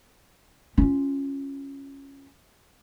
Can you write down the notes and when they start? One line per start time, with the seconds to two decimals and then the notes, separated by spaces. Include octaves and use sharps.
0.78 C#4 F4